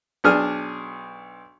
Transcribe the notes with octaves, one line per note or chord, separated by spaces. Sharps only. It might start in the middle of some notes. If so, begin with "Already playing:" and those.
B1 D4 G#4 F6